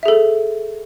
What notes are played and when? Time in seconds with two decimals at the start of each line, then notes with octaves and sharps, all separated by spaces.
0.03 E5
0.06 G#4
0.08 A4